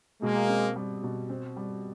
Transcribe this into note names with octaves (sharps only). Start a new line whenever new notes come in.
B2 G#3 A#3
C4
G3
B2
C4
G3